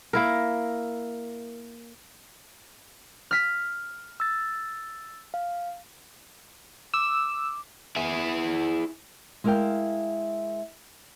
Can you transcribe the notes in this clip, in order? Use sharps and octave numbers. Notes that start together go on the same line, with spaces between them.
A#3 E4 A#4
F6 B6
E6 A6
F5
D6 E6
E4 G#4
G#3 E4 A#4 E5 F5 G5